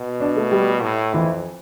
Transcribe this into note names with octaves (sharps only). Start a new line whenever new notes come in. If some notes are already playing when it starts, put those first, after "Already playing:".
Already playing: B2
D4
A3
G3
A2
F2 E3